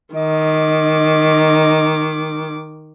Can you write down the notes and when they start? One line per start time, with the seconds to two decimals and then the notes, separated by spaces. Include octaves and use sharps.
0.15 D#3 D#5 D6